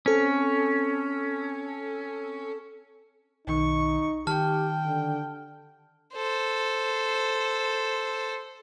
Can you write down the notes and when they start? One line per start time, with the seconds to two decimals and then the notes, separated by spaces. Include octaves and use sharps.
0.06 C4 C#4 A4 A5
3.47 B1 D#3 D#4 C#6
4.27 D#3 G4 G5 A5 F6
4.86 D3
6.15 A4 C5